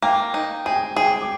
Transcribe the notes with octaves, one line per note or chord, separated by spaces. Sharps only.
A#3 G5
D#4
G#4 G5
G#4 G5
D6